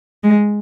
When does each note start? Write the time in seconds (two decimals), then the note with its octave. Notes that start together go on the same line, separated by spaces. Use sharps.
0.23 G#3